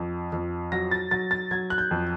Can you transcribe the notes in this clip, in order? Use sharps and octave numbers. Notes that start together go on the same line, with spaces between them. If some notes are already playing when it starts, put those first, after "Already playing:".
Already playing: F2
F2
F#3 A#6
A6
F#3 A6
A6
F#3 G#6
F#6
G6
F2